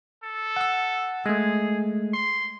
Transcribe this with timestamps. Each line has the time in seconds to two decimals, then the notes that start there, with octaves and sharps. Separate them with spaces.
0.23 A4
0.56 F#5 E6
1.26 G#3 A3 G#4
2.13 C6